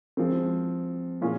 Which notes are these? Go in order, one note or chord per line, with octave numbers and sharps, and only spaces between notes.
F3 G#3 C4
A#2 G#3 C#4 F4